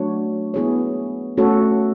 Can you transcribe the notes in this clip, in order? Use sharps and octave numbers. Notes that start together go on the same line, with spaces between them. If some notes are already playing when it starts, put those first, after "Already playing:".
Already playing: F#3 A3 D4 F#4 C#5
B3 E4 G#4 C#5
A3 C#4 F#4 A4 C#5